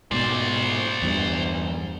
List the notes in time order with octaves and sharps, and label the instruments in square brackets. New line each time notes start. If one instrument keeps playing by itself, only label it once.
[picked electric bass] G#2 B2 [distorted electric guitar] C5 D5
[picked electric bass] E2 G2